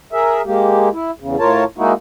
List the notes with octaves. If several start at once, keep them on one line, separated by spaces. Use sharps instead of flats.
G#4 A#4 E5
G#3 A#3 G4
E4
E2 C#3
A2 F4 A#4 C#5 A5
G#3 A#3 D#4 E4 F#4